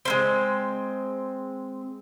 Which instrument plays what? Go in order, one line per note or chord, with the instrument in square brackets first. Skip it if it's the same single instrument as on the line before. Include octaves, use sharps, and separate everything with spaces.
[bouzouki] G#3 A#3 C4